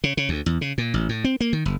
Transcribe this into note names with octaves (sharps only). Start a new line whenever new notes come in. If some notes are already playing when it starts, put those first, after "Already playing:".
C#3
C#3
D2
E2
C#3
A#2
A1
A2
C4
A#3
D#3
F#1